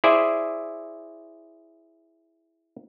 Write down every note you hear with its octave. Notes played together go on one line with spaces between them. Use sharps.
E4 G#4 C5 D5 E5